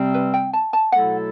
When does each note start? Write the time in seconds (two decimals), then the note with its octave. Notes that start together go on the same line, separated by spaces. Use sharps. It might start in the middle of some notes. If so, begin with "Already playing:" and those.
Already playing: C3 G3 C4
0.14 B4
0.34 G5
0.53 A5
0.73 A5
0.92 B2 F#3 A3 E4 A4 F#5